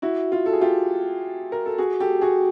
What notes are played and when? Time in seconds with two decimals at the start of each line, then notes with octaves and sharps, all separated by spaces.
0.02 E4 F#4
0.32 F4
0.46 A4
0.53 G#4
0.61 F4 G4
1.52 A#4
1.66 A4
1.78 F#4 G#4
2.00 G4 A4
2.21 F#4 G#4